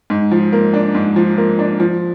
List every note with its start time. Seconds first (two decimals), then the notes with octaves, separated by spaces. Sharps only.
0.10 G#2
0.31 F3
0.52 A#3
0.73 D4
0.95 G#2
1.16 F3
1.37 A#3
1.59 D4
1.80 F3